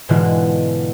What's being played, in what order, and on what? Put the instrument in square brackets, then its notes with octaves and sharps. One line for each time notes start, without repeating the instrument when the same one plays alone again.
[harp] G#2 B2 D3 E3 G#3 F4